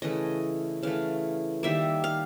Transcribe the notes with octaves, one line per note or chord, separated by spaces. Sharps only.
C#3 E3 A3 D#5
C#3 E3 A3 F5
D#3 G3 A#3 E5
F5